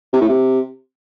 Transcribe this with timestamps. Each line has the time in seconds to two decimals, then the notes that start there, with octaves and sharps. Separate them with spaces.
0.13 C3
0.21 A2
0.29 C3